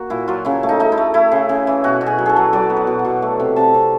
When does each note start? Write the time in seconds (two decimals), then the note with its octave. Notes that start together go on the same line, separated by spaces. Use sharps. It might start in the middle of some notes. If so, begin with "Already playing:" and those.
Already playing: A#3 F#4
0.10 A#2 E4
0.28 F#3 F4
0.45 C#3 E4
0.63 A3
0.69 D#4
0.80 A3 D#4
0.92 E4
0.97 A3
1.14 A3 E4
1.32 C#3
1.49 C#3
1.67 E3
1.84 B2 F#4
2.01 B2
2.07 G#4
2.18 F#3
2.26 G#4 A4
2.36 F#3
2.53 F#3 D5
2.70 B3
2.77 F#5
2.87 B2
2.99 F#5
3.05 B2
3.22 A3
3.40 C3
3.56 C3 A5
3.74 C3